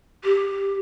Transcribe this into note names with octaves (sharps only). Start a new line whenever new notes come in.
G4